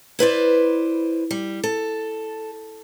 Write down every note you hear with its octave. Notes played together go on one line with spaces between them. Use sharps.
E4 B4 C5 D5
G3
A4